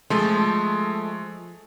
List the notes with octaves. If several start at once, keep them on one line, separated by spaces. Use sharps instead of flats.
F3 G#3 A3